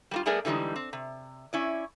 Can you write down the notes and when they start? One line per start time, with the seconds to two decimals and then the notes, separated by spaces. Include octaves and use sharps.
0.11 G3 A#3 F4
0.26 G3 A3 B3 G#4 A#4 D5
0.45 D3 E3 G3 G#3 D#4
0.76 C4
0.93 C3
1.53 C#4 E4 D5